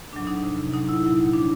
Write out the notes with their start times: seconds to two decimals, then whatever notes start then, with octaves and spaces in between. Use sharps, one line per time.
0.13 A2 D4
0.16 F#3
0.27 D#4
0.43 F2 C3 F3
0.73 A2 F#3 D#4
0.89 E4
1.03 A#2 E4
1.06 F#3
1.33 C#3 F3 D4